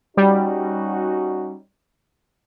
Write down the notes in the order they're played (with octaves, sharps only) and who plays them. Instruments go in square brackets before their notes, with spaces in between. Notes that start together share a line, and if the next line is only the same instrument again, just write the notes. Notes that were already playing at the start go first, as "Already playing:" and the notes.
[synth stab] G3 [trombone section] C#4 D#4 F#4